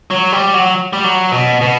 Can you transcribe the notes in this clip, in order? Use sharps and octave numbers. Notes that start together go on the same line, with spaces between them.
F#3
G3
F#3
G3
F#3
B2
B2